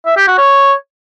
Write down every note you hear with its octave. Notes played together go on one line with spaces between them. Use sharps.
E5
G4
F#4
C#5